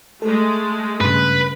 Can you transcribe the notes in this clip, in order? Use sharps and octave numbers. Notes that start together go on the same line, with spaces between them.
G#3 A3 A4
G2 C#3 B4 B5